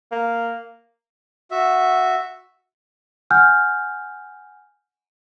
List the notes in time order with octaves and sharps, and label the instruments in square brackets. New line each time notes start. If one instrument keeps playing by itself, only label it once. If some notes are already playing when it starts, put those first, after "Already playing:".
[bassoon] A#3
[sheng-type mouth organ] F#4 E5
[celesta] F#5 G#5 F6 G6